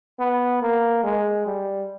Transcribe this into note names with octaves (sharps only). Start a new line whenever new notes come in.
B3
A#3
G#3
G3